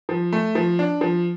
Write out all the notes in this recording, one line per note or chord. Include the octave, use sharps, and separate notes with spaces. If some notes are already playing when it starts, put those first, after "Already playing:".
F3
A3
F3
D4
F3